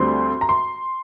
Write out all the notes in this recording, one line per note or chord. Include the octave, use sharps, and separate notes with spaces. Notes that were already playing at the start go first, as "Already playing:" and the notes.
Already playing: D2 D3 G3 C4 C6
A#5
C6